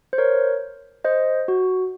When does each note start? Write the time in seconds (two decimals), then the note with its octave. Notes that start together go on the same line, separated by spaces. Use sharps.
0.13 C5
0.18 A#4 C#5
1.05 C5 D#5
1.48 F#4